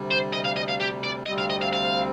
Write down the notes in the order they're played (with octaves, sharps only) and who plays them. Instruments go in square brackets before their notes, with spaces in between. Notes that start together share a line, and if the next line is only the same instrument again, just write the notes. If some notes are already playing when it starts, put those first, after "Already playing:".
Already playing: [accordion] D2 C3 G3
[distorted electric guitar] C5
D#5
F5
D#5
F5
G4
D5
[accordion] D2 C3 G3 C4 [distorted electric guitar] D#5
[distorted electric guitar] F5
D#5
F5
F5